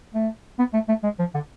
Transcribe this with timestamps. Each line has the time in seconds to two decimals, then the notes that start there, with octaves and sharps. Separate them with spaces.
0.14 A3
0.59 B3
0.73 A3
0.88 A3
1.03 G#3
1.19 F3
1.34 D3